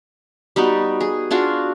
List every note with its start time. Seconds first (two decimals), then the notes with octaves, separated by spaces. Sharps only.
0.56 G3 B3 D#4 F#4
1.01 G#4
1.31 D4 F4 F#4 G#4